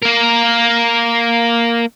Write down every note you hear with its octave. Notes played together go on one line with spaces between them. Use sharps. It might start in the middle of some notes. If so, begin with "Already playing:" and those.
A#3 A#4